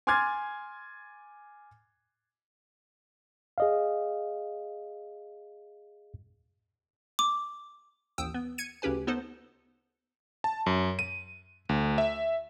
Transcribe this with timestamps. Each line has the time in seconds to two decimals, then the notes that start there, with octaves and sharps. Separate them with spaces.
0.07 G#5 C6 D6 F6 G#6 A6
3.58 G#4 D#5 F5
7.19 D6
8.18 A1 D#2 G5 D#6 E6
8.34 B3
8.58 G#6 C#7 D#7
8.82 D2 C#3 C#4 G4 B4 G#5
9.07 B3 D#4 A4 C5
10.44 A5
10.66 F#2
10.99 D#7
11.69 D2
11.98 E5